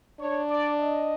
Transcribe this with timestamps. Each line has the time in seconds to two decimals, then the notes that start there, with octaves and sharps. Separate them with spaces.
0.20 D4 C#5
0.50 D5
0.79 D#5